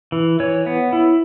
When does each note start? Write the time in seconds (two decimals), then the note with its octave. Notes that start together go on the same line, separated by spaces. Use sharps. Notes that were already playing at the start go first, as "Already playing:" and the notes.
0.12 E3
0.40 E3 C#5
0.66 B3
0.93 E4